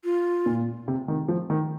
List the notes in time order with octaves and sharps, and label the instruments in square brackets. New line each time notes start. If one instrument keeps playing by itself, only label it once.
[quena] F4
[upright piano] A#2
C3
D#3
F3
D#3